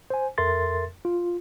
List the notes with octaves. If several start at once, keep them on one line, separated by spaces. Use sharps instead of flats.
C5 G#5
F2 A4 A#4 E5 C6 A6
F4